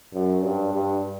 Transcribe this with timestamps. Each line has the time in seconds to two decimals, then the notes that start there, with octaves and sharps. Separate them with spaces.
0.13 F#2
0.42 G2
0.73 G2